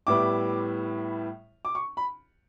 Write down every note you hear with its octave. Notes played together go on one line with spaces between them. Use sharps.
A2 G3 B3 E4 D6
D6
C#6
B5